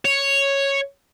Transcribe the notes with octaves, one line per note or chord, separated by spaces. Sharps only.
C#5